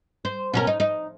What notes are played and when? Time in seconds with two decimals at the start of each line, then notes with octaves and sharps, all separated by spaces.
0.25 C5
0.53 B2 C#4 A#4
0.67 D#4
0.80 D#4